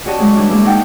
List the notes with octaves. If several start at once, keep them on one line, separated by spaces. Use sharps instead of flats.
C#4 F#4 G4 D5 D#5 A5
F#3 G#3 C#4
E3 F#3 G3 D4 E4
G#3 A#3 E4
D#4 F#5 G5